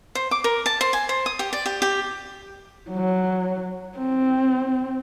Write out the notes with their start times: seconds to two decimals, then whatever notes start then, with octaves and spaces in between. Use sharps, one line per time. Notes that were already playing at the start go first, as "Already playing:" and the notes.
0.15 C5
0.31 D6
0.44 A#4
0.66 A5
0.81 C5
0.93 G#5
1.09 C5
1.26 D#6
1.39 G4
1.53 D5
1.66 G4
1.82 G4
2.90 F#3
3.99 C4